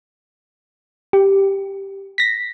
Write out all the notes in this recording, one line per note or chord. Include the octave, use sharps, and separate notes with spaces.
G4
A#6 B6